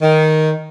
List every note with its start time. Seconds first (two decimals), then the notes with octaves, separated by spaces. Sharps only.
0.02 D#3